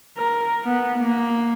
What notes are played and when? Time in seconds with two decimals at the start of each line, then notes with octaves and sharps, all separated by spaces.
0.17 A#4
0.64 B3
0.98 A#3